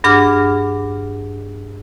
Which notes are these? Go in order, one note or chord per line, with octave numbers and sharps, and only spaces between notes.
G2 D4 G#4 F#5 D6 F6